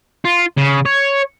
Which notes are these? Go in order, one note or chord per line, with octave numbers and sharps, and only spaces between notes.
F4
C#3
C#5